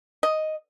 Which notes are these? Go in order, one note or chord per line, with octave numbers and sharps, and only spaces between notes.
D#5